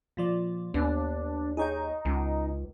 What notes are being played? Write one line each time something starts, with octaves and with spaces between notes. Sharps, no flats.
A#2 F3 D5
D#2 B3 D4
D#4 G#4 C#5 G5
C#2 C#3